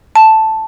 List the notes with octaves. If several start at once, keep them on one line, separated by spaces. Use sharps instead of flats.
A5